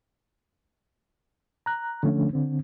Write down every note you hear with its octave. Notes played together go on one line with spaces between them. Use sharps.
A#5 F#6
D3 F3 A3 C#4 D4
D3 C4